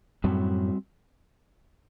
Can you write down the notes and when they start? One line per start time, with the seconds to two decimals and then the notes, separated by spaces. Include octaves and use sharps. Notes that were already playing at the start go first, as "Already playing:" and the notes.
0.24 F#2 A2 G3 C4 F#4